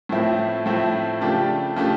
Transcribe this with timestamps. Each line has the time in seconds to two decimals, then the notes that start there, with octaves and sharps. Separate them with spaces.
0.09 A2 F3 A3 C4 E4
0.66 A2 F3 A3 C4 E4
1.21 C#3 F3 A3 D4 G4
1.76 C#3 F3 A3 D4 G4